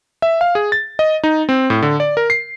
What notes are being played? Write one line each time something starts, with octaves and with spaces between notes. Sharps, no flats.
E5
F5
G#4
A6
D#5
D#4
C4
A2
D3
D5
A#4
C7